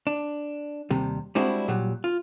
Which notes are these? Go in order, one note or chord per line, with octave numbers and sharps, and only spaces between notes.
D4
D#2 C3 G3
G3 G#3 C4 D4 E4 F#4
A#2 F#3 G3
F4